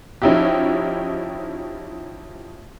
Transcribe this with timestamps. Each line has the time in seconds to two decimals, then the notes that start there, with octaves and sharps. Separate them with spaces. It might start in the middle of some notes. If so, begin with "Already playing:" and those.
0.22 F3 C#4 D#4 E4 F#4 G4